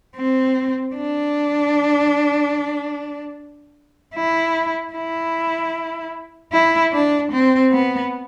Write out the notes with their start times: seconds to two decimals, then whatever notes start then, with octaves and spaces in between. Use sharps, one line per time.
0.16 C4
0.96 D4
4.15 E4
4.93 E4
6.52 E4
6.92 D4
7.32 C4
7.72 B3